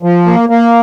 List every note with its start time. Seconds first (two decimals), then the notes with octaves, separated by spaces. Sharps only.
0.03 F3
0.26 A#3
0.49 A#3